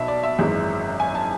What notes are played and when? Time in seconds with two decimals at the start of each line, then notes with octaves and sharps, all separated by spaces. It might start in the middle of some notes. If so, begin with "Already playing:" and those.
Already playing: B1 B2 E5 A5
0.08 D5
0.23 E5
0.39 G#1 F#2 E3 G#3
1.00 G#5
1.15 A5